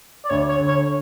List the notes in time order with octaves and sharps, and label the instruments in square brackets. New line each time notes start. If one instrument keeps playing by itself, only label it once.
[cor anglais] D5
[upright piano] D2 [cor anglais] C#5
[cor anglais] C#5
[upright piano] D3
[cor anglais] C#5